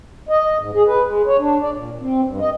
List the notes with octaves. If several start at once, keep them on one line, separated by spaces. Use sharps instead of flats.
D#5
G#2
G#4
B4
G#3
C#5
D4
D5
A#2
C4
G2
D#5